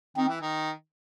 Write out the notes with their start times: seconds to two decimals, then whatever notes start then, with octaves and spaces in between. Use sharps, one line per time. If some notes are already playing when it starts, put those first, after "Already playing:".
0.17 D#3 C4
0.28 E3
0.41 D#3